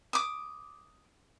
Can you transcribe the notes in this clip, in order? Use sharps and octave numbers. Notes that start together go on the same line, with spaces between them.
D6 D#6